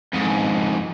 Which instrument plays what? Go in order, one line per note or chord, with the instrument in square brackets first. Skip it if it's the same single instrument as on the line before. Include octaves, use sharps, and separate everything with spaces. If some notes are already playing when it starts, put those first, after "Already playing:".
[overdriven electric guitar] F2 G#2